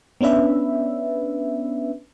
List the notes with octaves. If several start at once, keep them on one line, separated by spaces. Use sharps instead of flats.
B3 C#4 D4 B4 E5